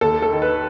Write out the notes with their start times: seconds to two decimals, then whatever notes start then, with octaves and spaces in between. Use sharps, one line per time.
0.01 D#2 A4
0.22 A4
0.32 D#3
0.42 B4